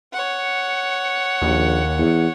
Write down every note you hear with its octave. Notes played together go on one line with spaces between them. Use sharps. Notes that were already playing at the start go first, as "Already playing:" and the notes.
C#5 F#5
A#1 D#2
E2